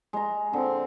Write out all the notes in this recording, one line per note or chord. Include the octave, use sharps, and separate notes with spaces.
G#3 A#5
D3 C4 F4